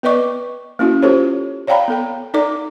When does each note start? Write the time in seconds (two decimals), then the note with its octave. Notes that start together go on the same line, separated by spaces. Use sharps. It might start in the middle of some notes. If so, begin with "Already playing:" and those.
0.03 B3 B4 D5 D#5 C#6 D6
0.79 A#3 C#4 E4 F#4
1.02 F4 G4 A4 C5 C#5
1.67 C#5 D5 F5 G5 A#5 B5
1.88 B3 A4 G5
2.34 D#4 A4 D5 D6